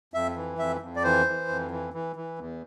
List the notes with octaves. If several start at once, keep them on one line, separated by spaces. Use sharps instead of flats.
F2 E5
E3
F2 E5
F2
D5
E3 C5
E3
F2
E3
E3
E3
E2